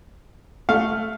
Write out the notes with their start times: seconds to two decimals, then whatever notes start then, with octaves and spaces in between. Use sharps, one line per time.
0.69 A3 F5